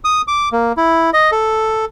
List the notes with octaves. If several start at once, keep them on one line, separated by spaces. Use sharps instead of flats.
D#6
D6
A#3
E4
D#5
A4